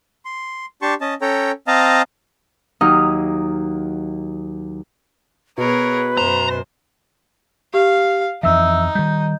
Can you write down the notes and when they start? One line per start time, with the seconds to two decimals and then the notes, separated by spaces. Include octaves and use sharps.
0.25 C6
0.82 D4 G4 A5 C6 C#6
1.01 C#4 D#5 A5
1.21 C#4 A4 C#5 G5 A#5
1.67 C4 D#5 F5 A5 A#5
2.81 D#2 F#3 D#4 D#5 F6
5.58 B2 G#4 A#4 B4 C#5
6.17 F#2 C5 A#5
7.74 G4 F5
8.43 F2 E3 D#4 E5 E6
8.95 D#3 G3 G6